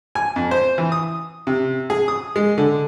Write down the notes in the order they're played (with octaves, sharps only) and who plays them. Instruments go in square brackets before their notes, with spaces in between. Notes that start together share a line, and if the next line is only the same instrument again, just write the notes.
[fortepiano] G#5
F2
C5
E3
D#6
C3
G#4
D#6
G#3
D3